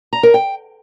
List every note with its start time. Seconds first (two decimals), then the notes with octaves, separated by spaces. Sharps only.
0.13 A#5
0.23 A#4
0.34 G5